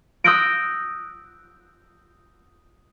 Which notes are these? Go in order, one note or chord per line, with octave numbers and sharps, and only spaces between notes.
D#6 E6 F#6 G6 A#6 D7